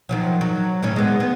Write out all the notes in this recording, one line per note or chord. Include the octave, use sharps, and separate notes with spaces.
D#3 F3 F#3
F#3
A2 D#3 C#4
G#3 B3
B3